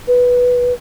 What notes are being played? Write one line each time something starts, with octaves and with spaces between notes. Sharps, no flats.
B4